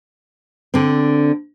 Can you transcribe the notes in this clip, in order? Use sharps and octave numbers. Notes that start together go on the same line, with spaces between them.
D3 C4